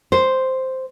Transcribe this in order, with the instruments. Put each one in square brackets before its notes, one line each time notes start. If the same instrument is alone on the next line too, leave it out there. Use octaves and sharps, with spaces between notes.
[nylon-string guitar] C5